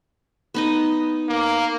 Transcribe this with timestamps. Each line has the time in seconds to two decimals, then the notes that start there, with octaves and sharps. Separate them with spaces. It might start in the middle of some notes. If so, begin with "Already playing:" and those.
0.54 B3 D#4 D#5
1.29 A#3